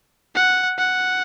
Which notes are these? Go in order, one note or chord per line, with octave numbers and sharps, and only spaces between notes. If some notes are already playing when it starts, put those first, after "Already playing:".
F#5
F#5